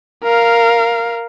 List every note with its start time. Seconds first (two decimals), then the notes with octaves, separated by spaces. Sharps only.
0.24 A#4 F5